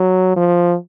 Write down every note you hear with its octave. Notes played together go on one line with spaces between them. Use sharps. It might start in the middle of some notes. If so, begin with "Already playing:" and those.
Already playing: F#3
F3